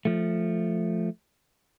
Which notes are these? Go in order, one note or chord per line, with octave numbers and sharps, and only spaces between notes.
F3 A3